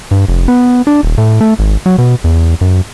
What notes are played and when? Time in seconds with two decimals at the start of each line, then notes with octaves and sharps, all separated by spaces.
0.11 G2
0.28 F1
0.48 B3
0.87 D4
1.03 D#1
1.18 A2
1.41 A3
1.59 G#1
1.86 F#3
1.98 B2
2.24 E2
2.61 F#2